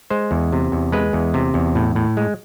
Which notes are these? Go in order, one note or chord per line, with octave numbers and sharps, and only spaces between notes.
G#3 C5
E2
C3
E2
G#3 B4
E2
C3
E2
A2
A2
G#3